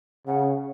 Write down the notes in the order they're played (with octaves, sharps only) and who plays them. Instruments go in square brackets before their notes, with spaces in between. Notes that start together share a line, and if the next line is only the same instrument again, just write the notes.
[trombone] C#3 [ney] F#5